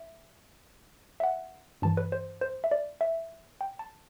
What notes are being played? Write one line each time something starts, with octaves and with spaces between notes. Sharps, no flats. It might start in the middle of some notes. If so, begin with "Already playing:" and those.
Already playing: E5
E5
F#5
G2 E3 A5
B4
C5
C5
E5
D5
E5
G5
A5